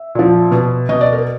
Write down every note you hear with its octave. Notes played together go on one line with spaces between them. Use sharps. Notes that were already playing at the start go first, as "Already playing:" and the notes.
Already playing: E5
A#2 F3
B2
B2 D#5
D5
A#4